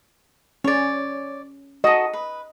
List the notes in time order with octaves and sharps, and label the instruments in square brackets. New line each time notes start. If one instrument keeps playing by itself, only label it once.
[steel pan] C#4 [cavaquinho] C#5 D5
[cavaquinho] F#4 A4 [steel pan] D#5
[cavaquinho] B4